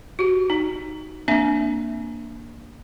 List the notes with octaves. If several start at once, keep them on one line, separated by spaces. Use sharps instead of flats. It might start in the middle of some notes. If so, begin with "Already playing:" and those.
F#4 G4
D#4
A#3 C4 D4 E5